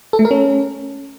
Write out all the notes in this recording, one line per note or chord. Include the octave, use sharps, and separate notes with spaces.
A4
A3
A#4
C#4